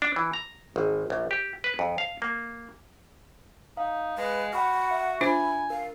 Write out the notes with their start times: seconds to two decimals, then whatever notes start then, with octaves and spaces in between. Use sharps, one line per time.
0.02 D4
0.16 E3
0.33 A#5
0.76 G#1
1.10 A#1
1.31 G4
1.64 B4
1.79 F2
1.98 F5
2.22 A#3
3.77 D#4 F5
4.17 G#3 B4
4.53 F#4 F#5 G5 B5 F6
4.91 E5
5.21 D4 F4 C5 G#5 B5
5.70 A#4 F5